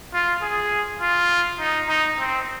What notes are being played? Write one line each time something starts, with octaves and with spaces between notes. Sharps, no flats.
F4
G#4
F4
D#4
D#4
C4